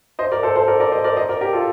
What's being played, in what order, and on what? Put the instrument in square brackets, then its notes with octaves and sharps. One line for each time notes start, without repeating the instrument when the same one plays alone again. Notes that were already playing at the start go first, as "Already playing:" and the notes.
[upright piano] C5 D#5
A#4 D5
A4 C5
A4 C5
A#4 D5
A#4 D5
C5 D#5
A#4 D5
C5 D#5
A#4 D5
G4 A#4
F4 A4